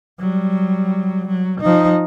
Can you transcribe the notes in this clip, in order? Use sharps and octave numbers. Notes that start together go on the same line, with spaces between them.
F#3 G3
F#3
F3 D#4